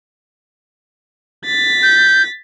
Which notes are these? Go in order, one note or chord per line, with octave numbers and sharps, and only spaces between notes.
A6 B6
G6